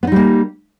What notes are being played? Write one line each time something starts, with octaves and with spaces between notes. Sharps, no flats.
G3 A#3 B3 D#4